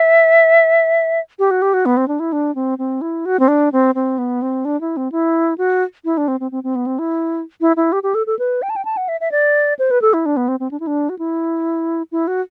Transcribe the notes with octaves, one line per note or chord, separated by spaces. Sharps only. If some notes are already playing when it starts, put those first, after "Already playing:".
Already playing: E5
G4
F#4
G4
F#4
B3
C4
D4
E4
D4
C4
C4
E4
F#4
C4
D4
C4
C4
B3
C4
D4
E4
C4
E4
F#4
E4
D4
C4
C4
C4
C4
B3
C4
E4
E4
E4
G4
G4
A4
A4
B4
G5
A5
G5
A5
F#5
E5
E5
D5
C5
B4
A4
E4
D4
B3
C4
C4
D4
E4
D4
F#4
E4
E4
F#4